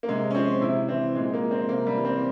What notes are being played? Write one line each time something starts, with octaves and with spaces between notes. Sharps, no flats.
A#3
C3 G#3
C#4
F3 C4
C3 E4
E3 C4
A#2 G#3
A#3
F3
C4
C3 A#3
G3
E3
C4